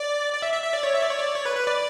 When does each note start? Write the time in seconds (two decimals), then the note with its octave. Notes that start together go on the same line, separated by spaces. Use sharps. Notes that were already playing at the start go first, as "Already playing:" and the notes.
Already playing: D5
0.33 D5
0.42 E5
0.53 E5
0.63 E5
0.73 D5
0.83 C#5
0.94 E5
1.03 D5
1.11 C#5
1.19 D5
1.35 C#5
1.45 B4
1.56 B4
1.67 D5